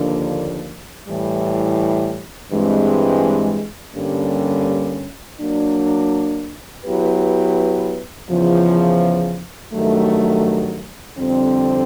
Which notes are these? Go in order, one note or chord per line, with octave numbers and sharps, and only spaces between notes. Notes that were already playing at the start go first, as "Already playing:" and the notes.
Already playing: D#2 D3 F3 A#3 D4
A2 E3 G3
G2 E3 G#3 C4
G2 D3 G3 A#3 C#4
F#3 A#3 D4
F#3 B3 E4 G4 B4
E2 C#3 F3
G2 D#3 F#3 A3
F2 D3 G3 C4